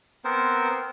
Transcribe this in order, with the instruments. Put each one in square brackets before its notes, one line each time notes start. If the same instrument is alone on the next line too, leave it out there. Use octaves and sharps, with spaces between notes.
[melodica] B3 C4 A#4 C5